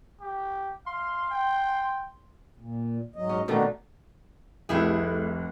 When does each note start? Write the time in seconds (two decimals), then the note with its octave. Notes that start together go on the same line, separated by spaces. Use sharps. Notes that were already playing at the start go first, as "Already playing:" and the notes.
0.21 G4
0.86 F5 C6
1.30 G5
2.57 A#2
3.16 G#2 F#3 D#5
3.29 C#4
3.48 B2 D#3 A3 D4 D#4 F#4
4.69 F1 C2 A3 E4 G#4